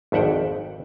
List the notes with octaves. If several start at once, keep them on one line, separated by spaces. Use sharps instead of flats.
G#1 F2 E5 F#5 G5